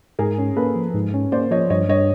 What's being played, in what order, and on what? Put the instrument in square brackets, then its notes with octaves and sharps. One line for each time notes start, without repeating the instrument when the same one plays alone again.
[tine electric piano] G#2 [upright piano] G#4 A#4
[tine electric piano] C#4
[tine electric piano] A#3 [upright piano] A4 B4
[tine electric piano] F3
G#2
C#4
[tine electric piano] A#3 [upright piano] C5 D5
[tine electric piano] F3 [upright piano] C#5 D#5
[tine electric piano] G2 [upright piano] C#5 D#5
[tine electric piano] G2 [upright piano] C#5 D#5